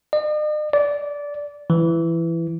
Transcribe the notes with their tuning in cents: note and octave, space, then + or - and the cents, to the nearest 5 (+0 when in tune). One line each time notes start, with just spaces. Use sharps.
D#5 -45
D5 -15
E3 +15